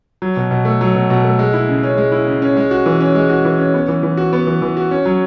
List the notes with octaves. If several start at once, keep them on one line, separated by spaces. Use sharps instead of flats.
F#3
B2
B2
A3
F#3
B2
B2
A3
G#3
E4
C#3
C#4
G#3
E4
C#3
C#4
G#3
F#4
E3
C#4
G#3
F#4
E3
C#4
B3
E3
E3
F#4
B3
E3
E3
F#4
C#4
F#3